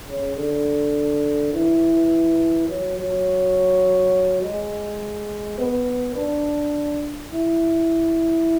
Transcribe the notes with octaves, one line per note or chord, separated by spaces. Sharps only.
C#3
D3
E3
F#3
F#3
G#3
B3
D4
E4